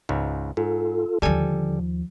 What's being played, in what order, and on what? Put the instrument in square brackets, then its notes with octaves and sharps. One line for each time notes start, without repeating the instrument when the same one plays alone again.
[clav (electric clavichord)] C#2 G#2
[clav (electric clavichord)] G#2 [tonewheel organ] F4 A4
[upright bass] D#2 F3 [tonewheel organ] D3 [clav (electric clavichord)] G3 A4 G#5